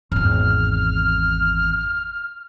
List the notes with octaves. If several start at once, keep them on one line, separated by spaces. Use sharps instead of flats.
G#1 E2 F6